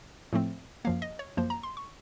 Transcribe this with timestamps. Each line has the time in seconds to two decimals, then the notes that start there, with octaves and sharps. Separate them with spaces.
0.33 A2 F3 A3 C4
0.85 F#2 F3 A#3 F5
1.02 D#5
1.19 C#5
1.37 F#2 F3 A#3 C5
1.50 A#5
1.63 C6
1.77 C#6